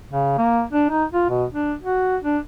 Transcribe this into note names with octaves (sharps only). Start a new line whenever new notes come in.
C#3
A#3
D4
D#4
F4
B2
D4
F#4
D4